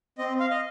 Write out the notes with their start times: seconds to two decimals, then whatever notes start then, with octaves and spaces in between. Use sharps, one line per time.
0.18 C4 D#5
0.40 F5
0.50 D#5